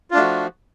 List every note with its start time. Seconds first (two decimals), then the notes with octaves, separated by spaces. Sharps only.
0.11 F4
0.14 D4
0.16 A3
0.19 F#4
0.22 F3